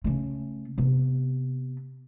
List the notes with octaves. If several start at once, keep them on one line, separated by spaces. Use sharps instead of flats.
C#3 A3
C3 B3